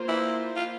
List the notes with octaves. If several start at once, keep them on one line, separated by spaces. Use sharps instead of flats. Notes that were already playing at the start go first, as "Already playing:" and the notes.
Already playing: A#3 F4 C5
E4
F4